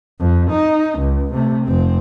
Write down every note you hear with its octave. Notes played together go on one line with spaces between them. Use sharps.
F2
D#4
C#2
C3 A3
F1 C4